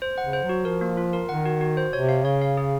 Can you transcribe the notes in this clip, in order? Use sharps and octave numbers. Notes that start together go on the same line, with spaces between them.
C5
C#3 F#5
C5
F#3
F#4
F3 A#4
A#3
F4
A#4
D#3 F#5
F#4
F#4
C5
C3 C#5
F5
C#3 C#5
F5
G#4